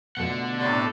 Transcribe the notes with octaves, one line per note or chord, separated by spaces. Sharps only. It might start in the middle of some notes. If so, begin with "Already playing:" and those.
B2 D3 A3 F4 F#5
A2 C3 D4 A4